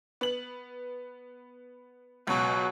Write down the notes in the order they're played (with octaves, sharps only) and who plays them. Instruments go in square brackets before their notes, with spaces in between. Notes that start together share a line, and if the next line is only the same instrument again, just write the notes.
[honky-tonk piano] B3 F#7
[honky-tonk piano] C#2 B2 [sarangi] F#3